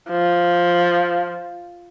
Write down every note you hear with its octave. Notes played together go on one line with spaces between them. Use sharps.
F3